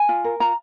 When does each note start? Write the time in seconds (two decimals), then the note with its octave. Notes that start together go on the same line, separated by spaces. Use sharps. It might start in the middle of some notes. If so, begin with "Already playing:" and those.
Already playing: G#5
0.09 F4
0.24 A#4
0.40 F4 A#5